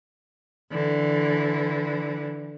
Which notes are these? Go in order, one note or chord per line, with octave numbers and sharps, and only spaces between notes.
D3 E3